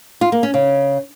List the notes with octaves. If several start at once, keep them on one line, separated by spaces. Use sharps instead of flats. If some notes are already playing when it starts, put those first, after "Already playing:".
F4
A#3
C#4
C#3